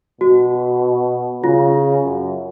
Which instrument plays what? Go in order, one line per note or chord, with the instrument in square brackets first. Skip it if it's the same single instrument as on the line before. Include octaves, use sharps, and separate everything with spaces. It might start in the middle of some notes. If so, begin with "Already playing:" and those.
[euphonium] B2 [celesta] F#4
[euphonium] C#3 [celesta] F4
[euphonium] F#2